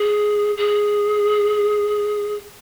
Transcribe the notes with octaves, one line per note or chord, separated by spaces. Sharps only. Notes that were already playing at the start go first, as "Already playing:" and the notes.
Already playing: G#4
G#4